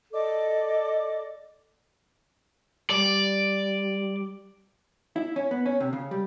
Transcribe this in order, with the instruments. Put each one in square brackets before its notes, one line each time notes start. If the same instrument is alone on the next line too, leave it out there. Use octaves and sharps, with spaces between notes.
[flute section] A4 D5 D#5 D6
[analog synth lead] G3 [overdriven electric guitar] D5
[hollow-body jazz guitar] E4
C#4
B3
C#4
C3
C#3
G3